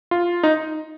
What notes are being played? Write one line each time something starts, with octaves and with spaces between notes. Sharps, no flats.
F4
D#4